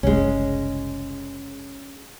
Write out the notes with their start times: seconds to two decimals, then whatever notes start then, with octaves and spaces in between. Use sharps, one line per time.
0.03 F#1 C2 G#3 C#4